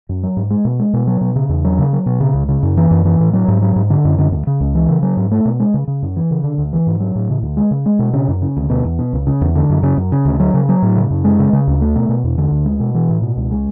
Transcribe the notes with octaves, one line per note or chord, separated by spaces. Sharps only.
F#2
F#3
G#2
G#3
B2
G#3
B2
F#3
B2
C#3
E2
F#3
C#3
F#3
B2
C#3
C#2
C#3
F#2
E3
F#2
E3
A2
F#3
G#2
F#3
G#2
D3
F#2
D3
D2
C#3
C#2
E3
C#3
F#3
G#2
A3
B2
G#3
C#3
C#3
F#2
E3
C#3
D3
D2
E3
G#2
F#3
A2
C#3
D2
G#3
C#3
G#3
B2
C#3
F#2
C#3
D2
B2
E2
B2
C#2
C#3
E2
D3
F#2
C#3
F#2
C#3
D2
F#3
C#3
F#3
A2
C#3
F#2
G#3
C#3
C#3
D2
A3
B2
B2
E2
D3
D2
G#3
B2
E3
A2
B2
C#2
G#3